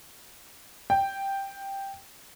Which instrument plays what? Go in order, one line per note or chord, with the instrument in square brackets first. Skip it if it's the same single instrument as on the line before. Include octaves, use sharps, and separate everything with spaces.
[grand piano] G5